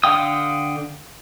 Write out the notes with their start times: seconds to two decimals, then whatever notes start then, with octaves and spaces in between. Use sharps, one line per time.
0.04 D3 F5 G5 D#6